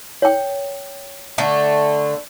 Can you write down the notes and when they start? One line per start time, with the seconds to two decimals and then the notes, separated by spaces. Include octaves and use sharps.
0.22 C#5 G5
1.38 D3 A3